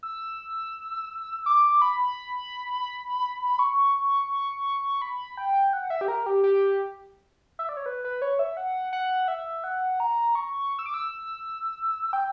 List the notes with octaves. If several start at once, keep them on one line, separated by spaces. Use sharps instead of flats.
E6
D6
B5
C#6
B5
G5
F#5
E5
G4
A#4
G4
G4
E5
D5
C#5
B4
B4
C#5
E5
F#5
F#5
E5
F#5
A#5
C#6
E6
D6
E6
G5